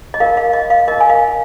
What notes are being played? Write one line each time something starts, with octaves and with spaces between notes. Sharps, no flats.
D#5
D#4 A#4 F5
F5
D#5
F5
D#4 A#4 D#5
G#5
F5